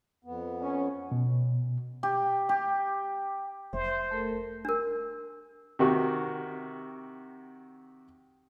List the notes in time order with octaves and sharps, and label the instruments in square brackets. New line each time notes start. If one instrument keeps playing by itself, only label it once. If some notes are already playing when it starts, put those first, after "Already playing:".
[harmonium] F2 B3
[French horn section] C#4
[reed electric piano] B2
[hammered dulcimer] G4
G4
[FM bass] F1 [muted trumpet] C5 [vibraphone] E5
[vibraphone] A3 A4 A#4
[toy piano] D4 A#4
[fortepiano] C3 D#3 F#4